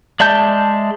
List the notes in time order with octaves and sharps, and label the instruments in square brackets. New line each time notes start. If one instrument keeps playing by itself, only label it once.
[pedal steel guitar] G#3 D5 E5 A5 G6